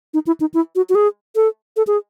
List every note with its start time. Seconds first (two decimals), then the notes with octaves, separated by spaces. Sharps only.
0.14 D#4
0.27 E4
0.40 D#4
0.54 E4
0.76 F#4
0.89 F#4
0.95 G#4
1.36 A4
1.77 A4
1.87 G#4